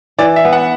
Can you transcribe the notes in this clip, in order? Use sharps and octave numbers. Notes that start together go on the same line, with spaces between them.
E3 D5
E5
B3
F#5